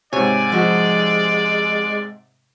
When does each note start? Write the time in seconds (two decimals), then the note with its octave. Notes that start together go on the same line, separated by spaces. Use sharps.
0.13 G#2 C3 C#5 D5 G#5
0.52 F3 G#3 F#4